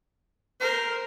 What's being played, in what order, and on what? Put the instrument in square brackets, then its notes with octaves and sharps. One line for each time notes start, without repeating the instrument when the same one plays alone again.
[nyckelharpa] A#4 [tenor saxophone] C5